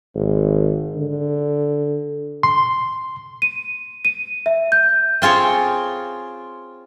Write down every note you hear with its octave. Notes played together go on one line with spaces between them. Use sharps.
G#1
D3
C6
D#7
D#7
E5
G6
C4 F4 G#4 C#5